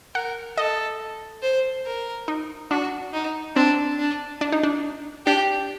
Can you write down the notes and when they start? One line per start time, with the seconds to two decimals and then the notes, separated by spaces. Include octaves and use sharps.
0.14 A#4 F#5
0.58 A4 D#5
1.42 C5
1.86 A#4
2.28 D#4
2.71 D4 F#4
3.13 D#4
3.56 C4 D4
3.99 D4
4.41 D4
4.52 D#4
4.63 D4
5.26 D4 G4